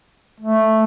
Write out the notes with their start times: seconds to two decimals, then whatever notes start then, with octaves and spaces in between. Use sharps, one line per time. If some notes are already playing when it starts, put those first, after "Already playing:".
0.40 A3